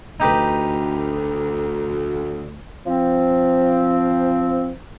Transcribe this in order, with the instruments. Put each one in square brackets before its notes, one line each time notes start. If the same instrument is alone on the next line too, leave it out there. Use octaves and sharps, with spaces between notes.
[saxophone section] D2 [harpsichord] D#4 G4 B4
[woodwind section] F3 C4